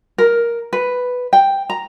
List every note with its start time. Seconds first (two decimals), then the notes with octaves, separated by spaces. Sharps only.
0.18 A#4
0.73 B4
1.33 G5
1.70 A#5